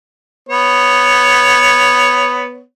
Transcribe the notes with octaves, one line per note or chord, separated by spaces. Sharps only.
B3 C#5